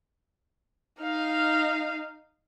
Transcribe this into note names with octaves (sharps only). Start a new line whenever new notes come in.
D#4 F5